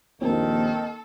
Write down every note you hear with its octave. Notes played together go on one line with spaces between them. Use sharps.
A#1 D#2 D#3 A#3 C4 A4